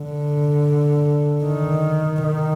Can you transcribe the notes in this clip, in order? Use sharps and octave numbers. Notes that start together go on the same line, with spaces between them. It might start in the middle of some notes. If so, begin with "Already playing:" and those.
Already playing: D3
D#3
D#3